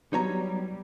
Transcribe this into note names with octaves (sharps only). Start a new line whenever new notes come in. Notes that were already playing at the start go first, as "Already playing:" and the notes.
F#3 G3 B3 D#4 F#4 C#5 A#5